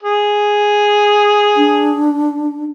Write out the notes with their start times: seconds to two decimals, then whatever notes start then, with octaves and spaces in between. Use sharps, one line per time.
0.03 G#4
1.57 D4